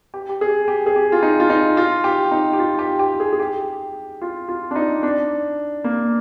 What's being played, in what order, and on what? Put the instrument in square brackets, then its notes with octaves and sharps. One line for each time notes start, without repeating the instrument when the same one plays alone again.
[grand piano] G4
G4
G#4
G4
G#4
G4
F4
D#4
F4
D#4
F4
G4
D#4
G4
F4
G4
G4
G#4
G#4
G4
F4
F4
D4
D#4
D4
A#3